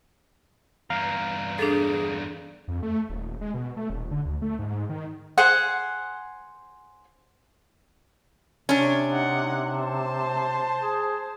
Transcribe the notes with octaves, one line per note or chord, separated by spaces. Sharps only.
E2 G2 F5 A#5
D4 G#4 A4
F2
A3
D#1
G#3
B2
A3
D#1
D3
D2
A3
G#2
D#3
G#4 C5 F#5
C3 C#4 D4
D#4 F#5
C5 A5
G#4